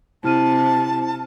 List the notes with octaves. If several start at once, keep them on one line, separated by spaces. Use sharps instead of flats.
C3 E4 A5 F6 D#7